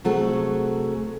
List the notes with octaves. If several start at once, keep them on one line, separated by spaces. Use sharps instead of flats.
C3 F#3 A3 F#4 G#4 A4